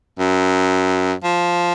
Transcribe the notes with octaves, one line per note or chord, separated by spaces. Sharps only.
F#2
F3